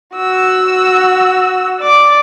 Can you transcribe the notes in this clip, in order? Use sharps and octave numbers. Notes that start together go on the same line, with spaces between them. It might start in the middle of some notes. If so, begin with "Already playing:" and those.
F#4 E6
D5 D6